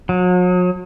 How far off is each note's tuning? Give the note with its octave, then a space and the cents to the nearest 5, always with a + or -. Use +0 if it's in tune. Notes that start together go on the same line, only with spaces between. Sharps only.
F#3 -40